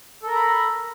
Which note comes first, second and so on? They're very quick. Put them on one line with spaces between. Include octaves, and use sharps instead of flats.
A4 A#4 A#5 B5